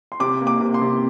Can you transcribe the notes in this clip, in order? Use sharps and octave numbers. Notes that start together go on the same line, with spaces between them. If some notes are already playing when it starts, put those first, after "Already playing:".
C6
C3 D6
A#3
D6
C3
C6
C3